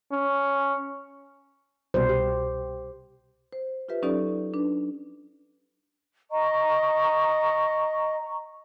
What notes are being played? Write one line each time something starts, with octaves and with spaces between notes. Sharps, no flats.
C#4
C2 B2 G3 C5
G4
C5
F4 G4 B4 E5
F#3 C#4 D#4 G4 A4 D5
D4 B4
D#5 A#5 C#6